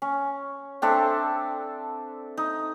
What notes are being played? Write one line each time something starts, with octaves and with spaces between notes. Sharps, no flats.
C#4
C4 D4 A4 E5
D#4